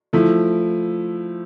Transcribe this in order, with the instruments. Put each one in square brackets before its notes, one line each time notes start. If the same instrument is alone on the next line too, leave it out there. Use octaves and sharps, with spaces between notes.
[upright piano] F3 A3 E4